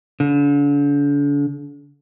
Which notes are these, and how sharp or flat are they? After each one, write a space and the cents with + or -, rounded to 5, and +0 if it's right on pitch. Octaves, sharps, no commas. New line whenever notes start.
D3 -40